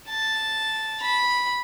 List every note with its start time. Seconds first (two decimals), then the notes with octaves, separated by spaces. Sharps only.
0.08 A5
1.01 B5